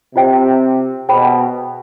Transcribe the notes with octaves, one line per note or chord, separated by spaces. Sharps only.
C3 F4 C5 D#5 G5
B2 G#4 C5 G5 B5